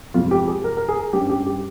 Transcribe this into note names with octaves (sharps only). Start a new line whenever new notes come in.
F2 C3 F3 G#3 F4
G4
G#4
A#4
A#4
G#4
G2 G3 C#4 G4
G4
G4